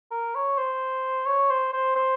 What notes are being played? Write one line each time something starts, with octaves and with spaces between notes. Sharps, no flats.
A#4
C#5
C5
C#5
C5
C5
C5